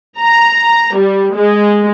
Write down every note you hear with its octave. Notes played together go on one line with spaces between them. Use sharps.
A#5
G3
G#3